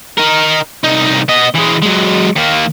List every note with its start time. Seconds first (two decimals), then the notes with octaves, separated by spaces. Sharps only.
0.17 D#4 A#4
0.84 C2 D#4
1.29 B3 D#5
1.54 E3 G#3
1.82 F#3 G#3
2.36 D#3 A#3